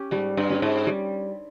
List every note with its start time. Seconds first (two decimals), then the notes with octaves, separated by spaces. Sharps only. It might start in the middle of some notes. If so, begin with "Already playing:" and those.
Already playing: C#4 G4
0.11 G#2 G3
0.37 G2
0.49 C#4 G4
0.62 G#2
0.87 G3